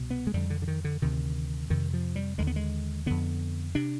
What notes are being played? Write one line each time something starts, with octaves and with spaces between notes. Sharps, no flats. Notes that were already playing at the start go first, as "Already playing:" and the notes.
Already playing: C2 B2
B3
G#3
F2 D3 G3
D3
D3
D#3
D3
D2 C3 D#3
F2 C3 D#3
F3
G3
D#2 D3 G#3
B3
G#3
F2 D3 B3
C3 D4